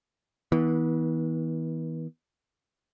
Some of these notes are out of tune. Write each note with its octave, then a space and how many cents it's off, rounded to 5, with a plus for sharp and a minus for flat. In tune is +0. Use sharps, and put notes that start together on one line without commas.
E3 -40 B3 -15